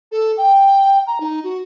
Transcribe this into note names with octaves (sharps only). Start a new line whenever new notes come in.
A4
G5
A#5
D#4
F#4